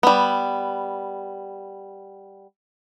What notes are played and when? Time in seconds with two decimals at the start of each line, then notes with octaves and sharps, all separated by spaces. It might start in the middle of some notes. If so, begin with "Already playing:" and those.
0.03 G3 B3